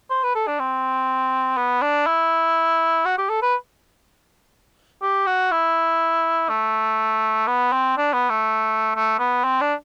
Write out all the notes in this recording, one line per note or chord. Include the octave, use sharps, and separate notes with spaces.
C5
B4
A4
D4
C4
B3
D4
E4
F#4
G4
A4
B4
G4
F#4
E4
A3
B3
C4
D4
B3
A3
A3
B3
C4
D4